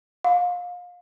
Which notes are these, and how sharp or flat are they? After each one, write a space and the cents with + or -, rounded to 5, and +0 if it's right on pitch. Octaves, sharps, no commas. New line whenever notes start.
F5 +30